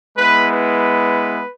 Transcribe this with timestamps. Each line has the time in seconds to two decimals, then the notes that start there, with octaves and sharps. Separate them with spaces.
0.17 G#3 B3 E4 B4
0.49 B4